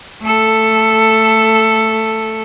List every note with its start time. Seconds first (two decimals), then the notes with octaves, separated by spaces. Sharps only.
0.22 A3 A4